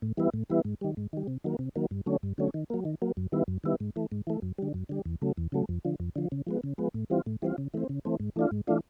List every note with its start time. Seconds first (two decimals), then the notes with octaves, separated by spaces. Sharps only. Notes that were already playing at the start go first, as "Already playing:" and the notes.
0.02 A2
0.17 E3 G3 B3 E4
0.34 A2
0.50 E3 G3 B3 E4
0.65 G#2
0.81 D#3 G3
0.97 G#2
1.13 D#3 G3
1.28 C3
1.44 D#3 F#3 A#3
1.59 C3
1.76 D#3 F#3 A#3
1.91 G2
2.06 D3 F#3 A3 C#4
2.23 G2
2.38 D3 F#3 A3 C#4
2.54 D#3
2.70 F#3 A#3
2.85 D#3
3.02 F#3 A#3
3.17 F#2
3.32 D#3 G3 B3 E4
3.48 F#2
3.64 D#3 G3 B3 E4
3.80 G#2
3.96 E3 A3
4.12 G#2
4.27 E3 A3
4.42 F#2
4.58 D3 G3
4.74 F#2
4.89 D3 G3
5.06 E2
5.22 C#3 F#3 A3
5.37 E2
5.52 C#3 F#3 A3
5.69 F2
5.85 D3 F3
6.00 F2
6.16 D3 F3
6.32 C#3
6.47 F3 G#3 B3
6.64 C#3
6.78 F3 G#3 B3
6.94 A2
7.10 E3 G3 C4 F4
7.26 A2
7.42 E3 G3 C4 F4
7.58 C#3
7.74 E3 A3 C4
7.89 C#3
8.05 E3 A3 C4
8.20 G#2
8.36 E3 A3 D4 F4
8.51 G#2
8.67 E3 A3 D4 F4